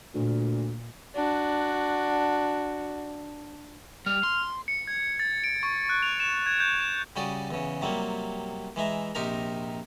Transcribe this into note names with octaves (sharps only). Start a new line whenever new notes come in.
D2 A#2
D4 F#4
G3 F6
C6
C#7
G#6
A6
D7
C#6
F#6
F7
E7
G#6
G6
E7
C#3 G3 F#4 D5 D#6
E2 C#3
C3 F#3 G3 A#3
E3 G#3 E5 A#5
A#1 C3 D#4 G4 A#4 A#5